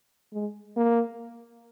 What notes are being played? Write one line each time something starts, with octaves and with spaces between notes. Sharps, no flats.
G#3
A#3